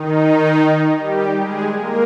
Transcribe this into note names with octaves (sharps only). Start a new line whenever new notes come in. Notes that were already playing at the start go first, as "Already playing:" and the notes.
Already playing: D#3 D#4
G3 G4
G#3 G#4
A#3 A#4